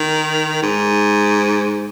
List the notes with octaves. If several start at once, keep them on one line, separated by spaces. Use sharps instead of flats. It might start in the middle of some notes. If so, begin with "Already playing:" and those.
Already playing: D#3
G#2